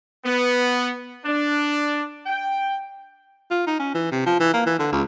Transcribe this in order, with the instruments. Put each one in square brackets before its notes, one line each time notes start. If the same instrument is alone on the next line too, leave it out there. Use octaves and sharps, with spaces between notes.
[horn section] B3
D4
G5
[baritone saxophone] F4
D#4
C#4
E3
C3
F3
E3
A#3
E3
D3
C#2